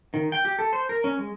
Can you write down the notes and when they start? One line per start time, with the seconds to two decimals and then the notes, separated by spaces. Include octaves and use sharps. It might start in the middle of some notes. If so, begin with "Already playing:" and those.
0.14 D#3
0.32 G5
0.45 G4
0.59 A4
0.73 C5
0.89 A#4
1.04 C#4
1.18 G#3